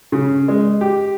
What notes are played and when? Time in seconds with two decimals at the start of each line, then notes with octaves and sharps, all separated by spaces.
0.12 C#3
0.48 G#3
0.81 G4